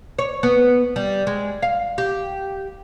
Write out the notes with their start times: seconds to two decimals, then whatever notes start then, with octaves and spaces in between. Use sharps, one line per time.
0.18 C#5
0.43 B3
0.96 G3
1.27 G#3
1.62 F5
1.98 G4